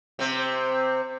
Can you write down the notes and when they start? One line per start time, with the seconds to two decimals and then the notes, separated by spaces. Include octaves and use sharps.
0.19 C3 C4